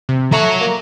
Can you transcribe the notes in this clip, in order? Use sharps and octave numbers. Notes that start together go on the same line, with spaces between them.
C3
F#3 A3 C#5 A#5
A#3